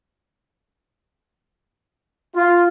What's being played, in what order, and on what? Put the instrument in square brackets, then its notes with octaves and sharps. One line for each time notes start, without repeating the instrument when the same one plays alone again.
[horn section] F4